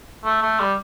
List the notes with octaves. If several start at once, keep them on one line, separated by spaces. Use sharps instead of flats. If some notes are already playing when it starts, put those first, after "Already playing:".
A3
A3
G3